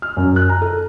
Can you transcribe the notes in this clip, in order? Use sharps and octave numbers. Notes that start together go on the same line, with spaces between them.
F6
F#2
F#6
A#5
A4